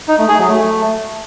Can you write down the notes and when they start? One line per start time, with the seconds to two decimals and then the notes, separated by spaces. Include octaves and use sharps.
0.08 D#4
0.18 A3
0.29 G#4
0.39 F#3
0.49 A3